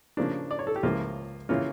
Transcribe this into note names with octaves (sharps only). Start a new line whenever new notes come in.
C#3 F3 A#3 D4
D5
C#5
A4
G4
C#2 C#3 F3 A#3 E4 F4
C#3 E3 A#3 C#4 F4